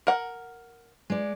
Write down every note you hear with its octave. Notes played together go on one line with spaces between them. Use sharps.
A#4 F#5
G#3 D5